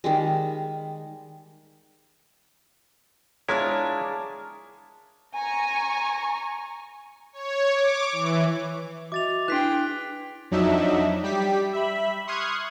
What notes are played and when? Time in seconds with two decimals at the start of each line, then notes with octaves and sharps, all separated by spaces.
0.04 D#3 G3 G#3
3.49 G#3 D4 E4 F4 G#4 A#4 C#5 G#5
5.35 G#5 A#5 C#6
7.32 C#5
7.72 D6
8.12 E3
9.12 F#4 D#5 E5 D6 A6 F7
9.48 D4 E4 G#4 B4 G5 F#6 B6 C7
10.51 F2 F#3 D4 D#4 E5
11.23 G3 G4 B6
11.73 E5 B5
12.27 C6 C#6 D#6 F6 F#6 G#6